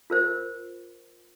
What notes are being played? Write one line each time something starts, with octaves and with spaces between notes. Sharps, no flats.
F4 A#4 C5